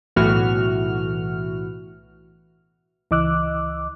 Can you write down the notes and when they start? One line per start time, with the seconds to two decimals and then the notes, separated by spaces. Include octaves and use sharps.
0.16 B1 A2 E3 F#4 F6
3.11 C#2 E3 D#5 D6 E6 F#6